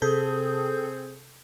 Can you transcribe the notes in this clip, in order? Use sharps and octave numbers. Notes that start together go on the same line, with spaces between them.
C3 C4 G#4 A4 G6